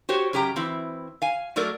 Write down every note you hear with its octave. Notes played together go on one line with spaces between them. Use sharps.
F#4 G4 C5 C#5
F#2 C#3 G4 G5 A#5
E3 C4 E4
F5 G#5
F#3 A3 A4 A#4 D5